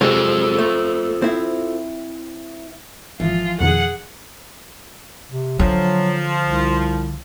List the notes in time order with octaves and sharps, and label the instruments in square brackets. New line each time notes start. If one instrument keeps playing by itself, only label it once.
[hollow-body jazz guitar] C3 F#3 G#3 [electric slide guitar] F4 A4 C5
[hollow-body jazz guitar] A3
C4 E4
[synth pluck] G#1 [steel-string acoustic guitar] E3 F3 [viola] F4
[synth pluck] F2 B2 D#3 [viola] G#4 F#5
[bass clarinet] C3
[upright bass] D3 [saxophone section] F3 [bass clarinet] F#3
[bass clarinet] C2